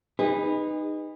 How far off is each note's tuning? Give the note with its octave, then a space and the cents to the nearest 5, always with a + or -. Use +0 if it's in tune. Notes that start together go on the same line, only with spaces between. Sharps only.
D#4 -10 G#4 -40 B4 +0